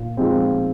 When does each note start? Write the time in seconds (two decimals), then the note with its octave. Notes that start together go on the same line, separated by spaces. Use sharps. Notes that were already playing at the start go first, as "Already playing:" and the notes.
Already playing: A#2
0.17 F3 G#3 C4